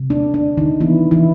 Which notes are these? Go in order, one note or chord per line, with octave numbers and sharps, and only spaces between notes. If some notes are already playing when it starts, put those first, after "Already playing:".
Already playing: C3
D4
D#3 D4
D#3 D#4
E3 B3 E4
E3 E4